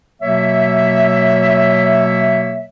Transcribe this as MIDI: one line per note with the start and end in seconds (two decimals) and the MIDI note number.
0.22 2.65 47
0.22 2.65 54
0.22 2.65 58
0.22 2.65 73
0.22 2.65 76